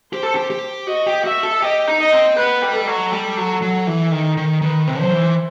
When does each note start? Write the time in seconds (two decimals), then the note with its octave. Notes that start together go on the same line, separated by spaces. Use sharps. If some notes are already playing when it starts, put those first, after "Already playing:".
0.13 G4 C5
0.23 A4
0.35 G4
0.50 G4
0.87 F#4 D#5
1.06 G4
1.24 F#4 E5
1.43 A4
1.62 G4 D#5
1.88 D#4
1.99 D#5
2.12 C4
2.37 B3 B4
2.62 G3
2.74 A4
2.87 F#3
3.12 G3
3.37 F#3
3.62 F#3
3.87 E3
4.11 D#3
4.37 D#3
4.62 D#3 B4
4.87 C3
4.99 F#3 C5
5.12 E3